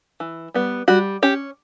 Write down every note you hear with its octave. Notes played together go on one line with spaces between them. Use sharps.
E3
G3 B3
G3 F#4
C#4 G4